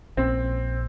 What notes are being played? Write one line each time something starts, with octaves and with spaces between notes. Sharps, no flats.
A#1 C4